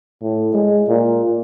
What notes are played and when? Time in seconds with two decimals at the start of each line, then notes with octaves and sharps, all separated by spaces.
0.22 A2
0.54 G#3
0.88 A#2